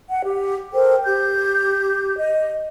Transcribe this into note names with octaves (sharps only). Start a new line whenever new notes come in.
F#5
G4
A4 A#4 C5 G5
G4 G6
D#5